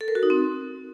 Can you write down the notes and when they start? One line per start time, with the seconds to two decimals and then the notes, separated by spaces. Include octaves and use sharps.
0.01 A4
0.08 A#4
0.15 F#4
0.23 D#4
0.30 C4